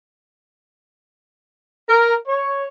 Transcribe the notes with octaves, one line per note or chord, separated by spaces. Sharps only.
A#4
C#5